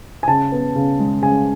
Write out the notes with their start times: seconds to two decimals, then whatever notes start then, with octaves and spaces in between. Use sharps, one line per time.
0.23 G#5
0.28 C#3 A5
0.52 B3
0.76 C#3
0.99 G#3
1.22 C#3 G#5